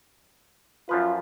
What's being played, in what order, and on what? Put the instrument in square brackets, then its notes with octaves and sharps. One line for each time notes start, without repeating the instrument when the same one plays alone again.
[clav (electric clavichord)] F#2 F3 B4 [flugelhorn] F4